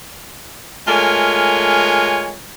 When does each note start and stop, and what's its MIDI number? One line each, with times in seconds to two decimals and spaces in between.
0.87 2.35 56
0.87 2.35 57
0.87 2.35 65
0.87 2.35 70
0.87 2.35 73
0.87 2.35 80